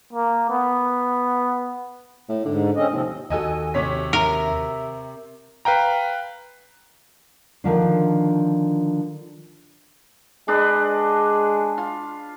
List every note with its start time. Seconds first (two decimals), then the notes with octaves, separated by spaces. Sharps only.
0.13 A#3
0.50 B3
2.29 A2
2.45 G#2 D3
2.76 D3 C4 C#4 D#5
2.92 D#2 C3 F3 C4
3.30 D#2 F#4 A4 D#5 G#5 E6
3.74 C3 C#5 B6
4.13 A#4 E5
5.65 B4 F5 G5 A#5
7.64 D3 D#3 F3 D4
10.48 G#3 D4 B4 D#5
11.78 F4